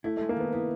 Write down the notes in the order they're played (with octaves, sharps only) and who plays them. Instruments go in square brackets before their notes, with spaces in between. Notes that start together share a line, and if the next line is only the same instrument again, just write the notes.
[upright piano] A3 [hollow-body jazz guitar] E4
[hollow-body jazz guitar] G#3 [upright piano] A3
[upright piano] A#3
[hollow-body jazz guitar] D#3 [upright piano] B3
[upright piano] B3 [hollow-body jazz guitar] E4